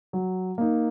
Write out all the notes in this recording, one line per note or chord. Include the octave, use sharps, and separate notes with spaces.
F#3
A#3 D#4